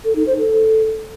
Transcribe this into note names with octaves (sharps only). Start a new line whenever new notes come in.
A4
D#4
C5
A4